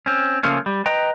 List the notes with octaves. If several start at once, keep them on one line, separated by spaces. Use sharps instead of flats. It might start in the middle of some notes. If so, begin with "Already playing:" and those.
C4 C#4
C#3 F3 A3 A#3 C#4
G3
B4 D#5 G5 A#5